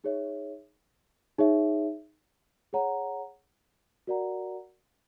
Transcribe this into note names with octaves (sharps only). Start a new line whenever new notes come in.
D#4 G#4 C#5 E5
D#4 G#4 C#5 E5
G#4 C#5 F#5 A#5
F#4 A#4 D5 F#5 A#5